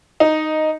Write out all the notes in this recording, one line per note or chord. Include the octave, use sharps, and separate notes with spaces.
D#4